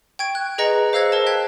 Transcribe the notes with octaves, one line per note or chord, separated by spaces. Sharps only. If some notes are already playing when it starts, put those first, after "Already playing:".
G5 C#6 G#6 D7
F#6
G#4 B4 D#5 A#5 A#6 C#7
C5 F5 E6 F#6 G#6 A#6
A#4 D#5 A5
G5 F#6 G#6 B6